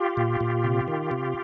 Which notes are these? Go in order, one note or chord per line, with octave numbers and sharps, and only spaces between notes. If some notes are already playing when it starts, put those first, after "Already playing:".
Already playing: F4 G4
A#2
A#2
C3
D#3
C3